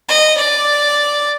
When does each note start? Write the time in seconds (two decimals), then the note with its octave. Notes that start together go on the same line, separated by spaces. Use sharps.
0.08 D#5
0.37 D5